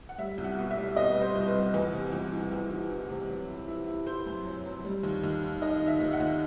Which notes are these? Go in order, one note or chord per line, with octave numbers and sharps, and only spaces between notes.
F#5
G3 E5
C2
F#5
B2
E5
G3
B2 D#5
G3 B4
C5
C2
B4
C2
E2 B4
C3
E2
E3
E2
E3
E3
C3
F#3
E4
E4
E4
E4 C5
F#2
F#3
F#3
G3
D#2
D#2
D#3
D#4 D#5
D#4
E5
D#2
F#5
D#2